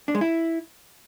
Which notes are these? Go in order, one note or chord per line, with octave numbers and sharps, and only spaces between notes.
D4
G#3
E4